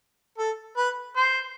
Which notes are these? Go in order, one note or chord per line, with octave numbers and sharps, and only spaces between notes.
A4
B4
C5